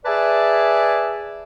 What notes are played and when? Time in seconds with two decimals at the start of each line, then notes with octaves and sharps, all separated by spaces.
0.06 G#4 B4 D5 E5 G#5 A5